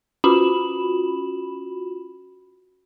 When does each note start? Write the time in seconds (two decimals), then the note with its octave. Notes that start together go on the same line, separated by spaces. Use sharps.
0.24 C#4 F4 F#4 B5 E7 F#7